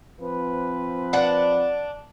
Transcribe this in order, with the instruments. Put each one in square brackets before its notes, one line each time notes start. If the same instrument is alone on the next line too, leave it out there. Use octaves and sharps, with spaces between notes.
[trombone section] F3 C4 B4
[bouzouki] D4 F#5